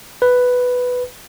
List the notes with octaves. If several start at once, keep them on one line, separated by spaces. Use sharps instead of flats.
B4